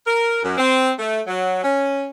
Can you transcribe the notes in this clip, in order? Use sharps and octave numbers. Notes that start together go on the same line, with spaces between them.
A#4
F#2
C4
A3
F#3
C#4